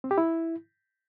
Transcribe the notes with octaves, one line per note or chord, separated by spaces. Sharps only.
C4
G4
E4